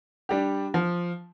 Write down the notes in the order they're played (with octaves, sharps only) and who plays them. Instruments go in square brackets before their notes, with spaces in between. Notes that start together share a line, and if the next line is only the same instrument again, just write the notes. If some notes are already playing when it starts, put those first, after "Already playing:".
[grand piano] G3 D4 G4
F3